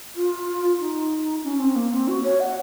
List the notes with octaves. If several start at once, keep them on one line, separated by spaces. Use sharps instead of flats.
F4
D#4
C#4
C4
A#3
C4
F#4
C#5
F#5